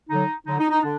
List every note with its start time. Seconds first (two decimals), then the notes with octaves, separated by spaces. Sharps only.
0.10 D3 F#3 D#4
0.46 D3 F#3 D#4
0.59 D#4
0.70 D#4
0.82 D3 D4